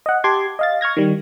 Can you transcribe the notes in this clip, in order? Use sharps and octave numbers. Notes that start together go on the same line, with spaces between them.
D#5 F#5
G4 A5 C6 D6 G#6
D#5 F5 A6
C#6 F6 G#6 A#6
D#3 G3